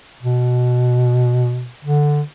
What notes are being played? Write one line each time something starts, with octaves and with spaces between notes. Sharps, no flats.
B2
D3